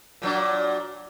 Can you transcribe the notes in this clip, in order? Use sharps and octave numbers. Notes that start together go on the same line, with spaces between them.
A#2 F#3 D4